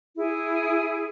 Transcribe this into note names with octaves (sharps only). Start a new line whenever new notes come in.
E4 G#4